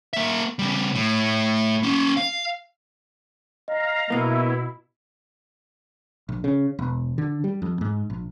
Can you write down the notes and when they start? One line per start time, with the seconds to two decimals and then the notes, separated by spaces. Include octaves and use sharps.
0.13 A#3 E5
0.59 C#3 G3
0.95 A2
1.83 A#3 C#4
2.17 F5
3.68 D#5 F5 A#5
4.10 B2 A#3 B3 E4
6.29 A#1
6.44 C#3
6.79 E1
7.18 D3
7.44 G3
7.62 F2
7.81 G#2
8.10 A#1